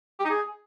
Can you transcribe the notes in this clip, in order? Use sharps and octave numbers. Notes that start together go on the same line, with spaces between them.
G4
D#4
G#4